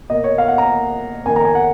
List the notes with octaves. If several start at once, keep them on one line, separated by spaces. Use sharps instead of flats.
B2 A#3 D#5
C#5
F5
F#5
A#5
F2 D#3 A#3 G#5
A#5
G#5
F#5